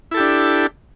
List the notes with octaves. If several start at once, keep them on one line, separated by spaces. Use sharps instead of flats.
D4 E4 G4 A4